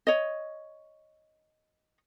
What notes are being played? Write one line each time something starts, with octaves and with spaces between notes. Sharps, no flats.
C#5 D#5